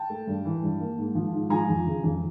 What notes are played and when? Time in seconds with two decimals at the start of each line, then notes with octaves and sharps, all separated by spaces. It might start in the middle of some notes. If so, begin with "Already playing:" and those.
Already playing: G5 A5
0.10 A3
0.27 G2
0.45 E3
0.62 G2
0.80 A#3
0.97 G#2
1.15 F3
1.33 G#2
1.50 F3 G#5 A#5
1.68 F2
1.86 C#3
2.04 F2